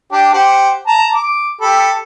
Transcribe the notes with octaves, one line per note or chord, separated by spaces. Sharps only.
D4 G4
G4 C5 F#5
A5 A#5
D6
G4 A4 B5